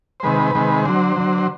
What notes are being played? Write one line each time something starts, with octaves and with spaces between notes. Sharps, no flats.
C5
C3 D#3 G#3 B4
C3 D#3 G#3
D3 F#3 C5
D3 F#3
C5